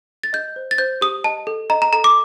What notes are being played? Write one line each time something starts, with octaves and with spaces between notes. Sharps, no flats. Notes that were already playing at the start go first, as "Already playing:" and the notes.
A6
D#5 G6
C5
A6
C5 G6
G4 D#6
D#5 A5
A4
D#5 A#5
A#5
A4 A#5
D6